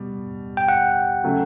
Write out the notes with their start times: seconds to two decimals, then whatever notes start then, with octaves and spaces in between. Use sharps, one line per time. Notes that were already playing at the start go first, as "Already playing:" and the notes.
Already playing: B2 G3
0.57 G5
0.69 F#5
1.24 C#3 F#3 A3